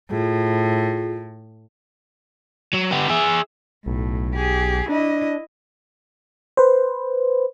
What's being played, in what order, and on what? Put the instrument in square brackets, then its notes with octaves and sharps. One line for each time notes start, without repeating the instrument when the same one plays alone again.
[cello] A2 [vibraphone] F4 G#4
[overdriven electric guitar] F#3
B3 G4
G#4 E5
[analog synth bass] B1 [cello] A2
[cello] G4 G#4
[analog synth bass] D4 [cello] E4 D#5
[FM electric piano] B4 C5